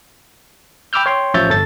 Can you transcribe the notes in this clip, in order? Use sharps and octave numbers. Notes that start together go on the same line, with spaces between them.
G5 B5 D6 E6 F6 G6
C#5 G5 C6
A1 F3 C#5 E5 G6 A6
G1 A4 A6